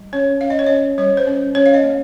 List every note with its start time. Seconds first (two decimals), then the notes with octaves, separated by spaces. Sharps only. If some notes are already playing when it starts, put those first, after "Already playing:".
Already playing: G3
0.13 C#4 C#5
0.41 C#4 F5
0.50 D#5
0.59 C#5
0.67 C#4 D#5
0.98 G3 C#5
1.17 C5
1.27 C#4
1.55 C#4 C#5
1.66 F5
1.74 D#5
1.84 A#3